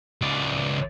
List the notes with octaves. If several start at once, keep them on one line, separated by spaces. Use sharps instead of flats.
C#2 D5